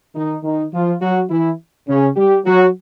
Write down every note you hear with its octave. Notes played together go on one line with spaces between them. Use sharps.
D#3 D#4
D#3 D#4
F3 F4
F#3 F#4
E3 E4
C#3 C#4
G3 G4
F#3 F#4